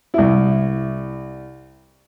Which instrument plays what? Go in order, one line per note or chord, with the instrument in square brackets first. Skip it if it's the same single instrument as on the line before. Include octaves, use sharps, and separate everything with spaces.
[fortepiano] C2 E4